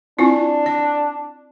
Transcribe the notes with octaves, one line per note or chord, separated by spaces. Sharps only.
C4 D4 E4 F4
D5